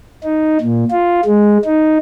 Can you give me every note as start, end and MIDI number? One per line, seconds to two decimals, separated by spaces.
0.24 0.58 63
0.61 0.84 46
0.91 1.20 65
1.25 1.58 56
1.65 1.98 63